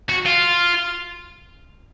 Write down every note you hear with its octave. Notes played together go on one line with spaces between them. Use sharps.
F#4
F4